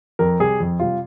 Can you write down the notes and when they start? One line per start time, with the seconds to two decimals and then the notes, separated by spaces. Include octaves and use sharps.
0.19 F2 A#4
0.39 C3 G3 G#4
0.60 F2
0.80 C3 G3 F4